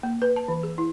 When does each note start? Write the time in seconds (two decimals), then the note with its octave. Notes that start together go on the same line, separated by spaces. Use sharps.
0.03 A#3
0.22 B4
0.36 A5
0.48 E3
0.63 G#4
0.78 E4